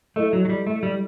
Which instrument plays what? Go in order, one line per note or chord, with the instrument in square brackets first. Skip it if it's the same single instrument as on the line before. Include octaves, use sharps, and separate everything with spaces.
[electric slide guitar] A3 [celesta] E4 A4 D#5
[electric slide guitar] F#3
F#3
G3
A3
G3